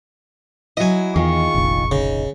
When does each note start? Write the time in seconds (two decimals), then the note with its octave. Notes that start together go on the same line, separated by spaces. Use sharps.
0.77 F#3 E4 D#5 G#5
1.16 E2 D#3 F4 G#4 C#6
1.54 F1 A#1
1.92 C#3 D#4